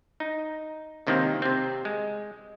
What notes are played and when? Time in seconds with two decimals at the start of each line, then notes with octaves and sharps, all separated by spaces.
0.20 D#4
1.07 C#2 C3 D#3 A#3 C4
1.42 C3 C4
1.85 G#3